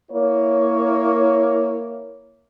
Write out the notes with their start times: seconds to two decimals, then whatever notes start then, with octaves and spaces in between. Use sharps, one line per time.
0.12 A#3 E4 C#5